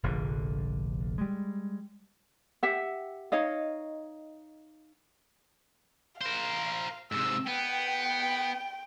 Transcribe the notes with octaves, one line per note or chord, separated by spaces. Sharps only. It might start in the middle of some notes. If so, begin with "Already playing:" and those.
F1 A#1 D3
G3 G#3
G4 E5 F#5
D#4 C#5 D#5 F5
A#4 C5 F5
G#2 C3 E6
B3 G5